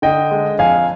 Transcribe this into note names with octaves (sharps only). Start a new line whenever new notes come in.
D3 D#5 G5
G#3
F2 F5 G#5